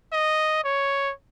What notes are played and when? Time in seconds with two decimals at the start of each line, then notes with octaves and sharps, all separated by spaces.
0.13 D#5
0.64 C#5